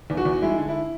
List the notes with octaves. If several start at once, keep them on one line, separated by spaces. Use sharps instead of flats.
E2
F#4
E2
G#3 E4
D3
E4